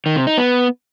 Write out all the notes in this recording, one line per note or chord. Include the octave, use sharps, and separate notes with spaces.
D#3
C3
D#4
B3